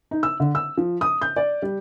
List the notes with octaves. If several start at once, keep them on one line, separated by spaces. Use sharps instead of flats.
D#4
E6
D3
E6
F3
D#6
G6
D5
G3